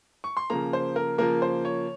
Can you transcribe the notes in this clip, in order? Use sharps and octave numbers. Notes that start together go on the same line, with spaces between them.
C#6
C6
C#3 F3 A#3 A#5
C5
A#4
C#3 F3 A#3 A#4
C5
C#5